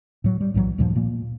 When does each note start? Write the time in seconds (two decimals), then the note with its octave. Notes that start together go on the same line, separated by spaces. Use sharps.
0.24 A2 F#3
0.41 G3
0.54 B1 A2 E3 F#3
0.78 D2 G2 A#2 F3
0.96 A#2 A#3